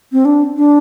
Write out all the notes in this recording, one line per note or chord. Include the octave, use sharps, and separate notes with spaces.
C4
D4
D4